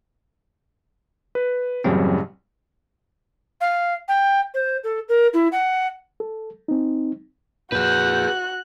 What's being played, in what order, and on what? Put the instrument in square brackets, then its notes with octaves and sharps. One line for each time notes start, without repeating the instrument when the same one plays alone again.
[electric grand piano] B4
[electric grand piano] A1 C#3 G3 [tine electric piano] F#2 F#3 C4
[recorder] F5
G5
C5
A4
A#4
E4
F#5
[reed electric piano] A4
C4 D#4
[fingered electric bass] F2 A#2 [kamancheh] F#4 F#6 [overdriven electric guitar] G#4 B4 [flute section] G6